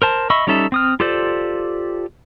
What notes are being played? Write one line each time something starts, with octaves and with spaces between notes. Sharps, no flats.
A#4 C5 A5
D#5 E5 B5 C#6 E6
G3 C#4 D#4 A4 E5
C4 D#6 F6
F4 G4 A4 C5 D5